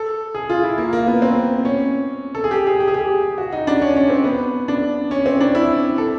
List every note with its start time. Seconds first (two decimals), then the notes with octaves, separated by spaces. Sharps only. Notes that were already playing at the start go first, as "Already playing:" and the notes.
Already playing: A4
0.35 G#4
0.49 F4
0.63 E4
0.78 A#3
0.93 A#3
1.07 B3
1.22 C4
1.65 C#4
2.35 A4
2.44 G#4
2.51 G4
2.67 G#4
2.80 G4
2.88 G#4
2.94 G4
3.38 F#4
3.53 D#4
3.67 D4
3.82 C#4
3.96 C#4
4.10 C4
4.24 B3
4.68 D4
5.11 C#4
5.26 C4
5.41 D4
5.55 E4
5.98 A4